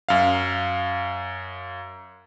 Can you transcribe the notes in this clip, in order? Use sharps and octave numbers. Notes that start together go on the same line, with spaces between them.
F#2 F5